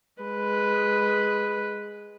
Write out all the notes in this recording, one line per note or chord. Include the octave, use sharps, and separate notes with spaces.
G#3 B4